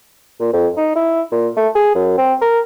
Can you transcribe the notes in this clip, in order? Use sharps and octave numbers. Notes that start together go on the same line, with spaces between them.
A#2
F2
D#4
E4
A#2
A3
G#4
F#2
C4
A#4